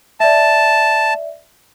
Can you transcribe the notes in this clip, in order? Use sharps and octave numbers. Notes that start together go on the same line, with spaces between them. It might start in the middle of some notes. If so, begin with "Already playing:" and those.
D5 E5 A5